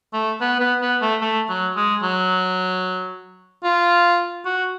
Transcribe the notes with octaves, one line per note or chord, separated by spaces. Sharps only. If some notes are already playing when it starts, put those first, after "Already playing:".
A3
B3
B3
B3
A3
A3
F#3
G#3
F#3
F4
F#4